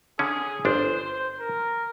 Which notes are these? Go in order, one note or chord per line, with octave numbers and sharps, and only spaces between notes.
D3 C#4 G#4
G1 D4 C5
C5
A#4